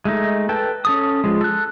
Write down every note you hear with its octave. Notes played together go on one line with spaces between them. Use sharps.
G#3 A3 D#4
A4 B4 G5 A5
C#4 A4 D#6
F3 G#3
A4 F#6